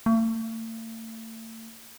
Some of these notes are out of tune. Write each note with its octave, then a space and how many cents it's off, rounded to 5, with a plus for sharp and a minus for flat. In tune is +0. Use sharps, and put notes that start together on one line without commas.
A3 +40